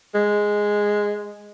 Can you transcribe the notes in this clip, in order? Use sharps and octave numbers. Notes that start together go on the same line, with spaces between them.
G#3